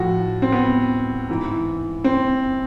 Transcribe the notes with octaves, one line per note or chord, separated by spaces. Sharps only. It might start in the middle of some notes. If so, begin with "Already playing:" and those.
Already playing: A2 F3 F#4
C4
B3
G#2 E3
C4